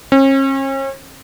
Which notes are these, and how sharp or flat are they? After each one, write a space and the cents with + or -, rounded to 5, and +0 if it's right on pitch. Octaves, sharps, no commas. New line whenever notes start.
C#4 -40